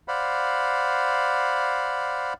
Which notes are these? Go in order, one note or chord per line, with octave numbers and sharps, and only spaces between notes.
C5 D5 F5 F#5 B5